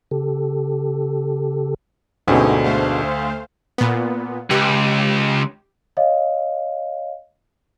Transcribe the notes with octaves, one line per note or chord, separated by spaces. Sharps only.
C#3 G4 A4
D2 G#2 B2 D3 C#4 D#4 G4
A3 C5 F5
A#2 B3
C#2 G4
C#5 D#5 F5